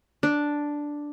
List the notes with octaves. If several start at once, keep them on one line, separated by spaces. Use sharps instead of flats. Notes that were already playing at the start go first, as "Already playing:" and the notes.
D4